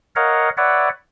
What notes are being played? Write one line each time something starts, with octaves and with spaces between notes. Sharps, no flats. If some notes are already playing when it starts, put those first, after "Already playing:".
A#4 C#5 D#5 F5 F#5
B4 C#5 D5 E5 F#5